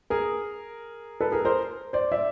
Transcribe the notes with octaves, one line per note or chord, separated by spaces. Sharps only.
G#4 A#4
A4 B4
G#4 A#4
A#4 C5
C5 D5
D5 E5